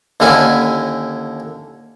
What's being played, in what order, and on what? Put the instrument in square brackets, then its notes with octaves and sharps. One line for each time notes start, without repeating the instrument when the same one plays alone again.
[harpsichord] D#2 D3 C#4 E4 G#5